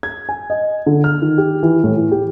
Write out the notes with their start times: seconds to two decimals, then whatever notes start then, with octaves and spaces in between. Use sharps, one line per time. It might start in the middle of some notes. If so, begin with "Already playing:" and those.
0.03 G#6
0.29 G#5
0.50 D#5
0.86 D3
1.04 F6
1.22 D#3
1.38 G4
1.63 E3
1.84 A2
1.97 E3
2.12 G4